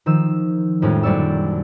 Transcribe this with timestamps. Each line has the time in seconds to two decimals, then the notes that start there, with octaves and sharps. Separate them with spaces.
0.06 D#3 F3 E6
0.82 F2 A2 D#3 G3 G#3 C#4
1.03 A#1 F#2 G3 D5 C#6 E6